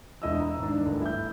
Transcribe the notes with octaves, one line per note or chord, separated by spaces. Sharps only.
E1 D4 E4 D#5 D#6 E6
A#5
G#1 D4
D1 G1
E4 G6